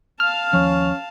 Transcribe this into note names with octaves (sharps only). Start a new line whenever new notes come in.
F5 A5 F6
D#2 F3 C#4